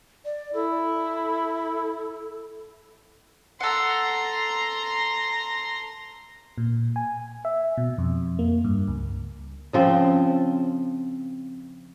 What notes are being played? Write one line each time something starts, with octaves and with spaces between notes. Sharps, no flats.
D5
E4 A4
A4 F#5 A#5 C6
A#2
G#5
E5
B2
F2
A#3
G2
C#2
C#3 F3 C4